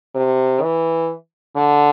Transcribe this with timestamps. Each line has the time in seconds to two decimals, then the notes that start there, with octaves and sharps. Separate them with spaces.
0.15 C3
0.62 E3
1.56 D3